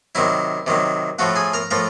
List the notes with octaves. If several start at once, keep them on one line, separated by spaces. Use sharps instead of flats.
C3 D#3 F#3 E4 E5
C3 D#3 F#3
A2 F3 A3 F#4 F#5
G#4 G#5
A#4 A#5
A2 F3 A3 A#4 A#5